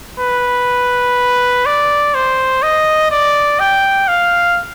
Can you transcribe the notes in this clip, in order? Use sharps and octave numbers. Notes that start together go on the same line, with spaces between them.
B4
D5
C5
D#5
D5
G5
F5